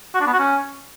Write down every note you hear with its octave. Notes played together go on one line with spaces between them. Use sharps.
F#4
D4
B3
F#4
C#4